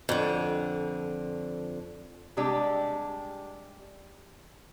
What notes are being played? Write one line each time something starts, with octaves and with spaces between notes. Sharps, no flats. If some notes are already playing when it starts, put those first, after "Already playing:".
F2 D3
C3 G3 G#3 D4 G4